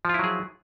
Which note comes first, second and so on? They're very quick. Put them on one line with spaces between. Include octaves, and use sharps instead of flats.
F3 F4 E4 F#3 G#4